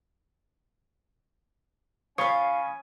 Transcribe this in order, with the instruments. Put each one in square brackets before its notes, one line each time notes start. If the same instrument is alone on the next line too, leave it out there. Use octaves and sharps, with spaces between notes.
[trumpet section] C#4 G#5 [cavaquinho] F4 F5 [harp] C#5 [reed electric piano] B5 C#6 D#6